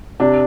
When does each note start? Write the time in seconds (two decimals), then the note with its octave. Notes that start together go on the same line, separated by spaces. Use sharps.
0.20 C3 D4